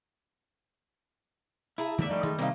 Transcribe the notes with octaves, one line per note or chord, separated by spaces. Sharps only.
E4 G#4 A5 A#5
D#2 D3 D#3 G3 G#3 D5 E5
F3 G3 A3 D#4
D#3 G#3
C3 G3 A3 A#3 D#4